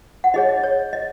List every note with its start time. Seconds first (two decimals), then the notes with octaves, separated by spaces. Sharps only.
0.24 F#5
0.34 D#4 G#4 C#5 D#5
0.49 D#5
0.63 C#5
0.93 D#5